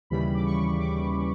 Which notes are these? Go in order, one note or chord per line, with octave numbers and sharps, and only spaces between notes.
D#2 C#3 E3 G3 B5
D6
C#6
D6